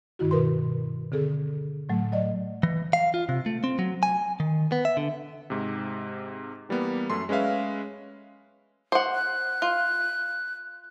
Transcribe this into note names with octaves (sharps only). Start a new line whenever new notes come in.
G2 D#3 E4 F#4
B2 A#4 B4 C6
D3 C4 G#4 A4
A2 F#3 A3
F#3 D5 D#5
E3
F5
F4
C3
A3
C4
F#3
G#5
D#3
B3
E5
D3
G#2 C3
E3 G3 A#3 B3
F#2 A3 C6
G#3 C#4 B4 E5 F5
C5 F#5
F#6
F4